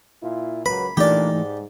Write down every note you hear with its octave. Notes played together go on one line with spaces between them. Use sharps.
A#2 E4 F4
C#2 F#3 A#3 B4 B5
A#1 A#2 E3 A3 D4 D#4 G4 D5
G#2